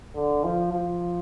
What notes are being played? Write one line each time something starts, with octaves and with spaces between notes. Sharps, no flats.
D3
F3
F3